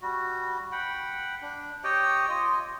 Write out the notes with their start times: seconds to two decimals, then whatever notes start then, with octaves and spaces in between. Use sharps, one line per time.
0.02 G3 F#4
0.72 F#5 G5 B5
1.41 D4
1.84 G4 C#5 D#5 G5
2.29 F4 D#5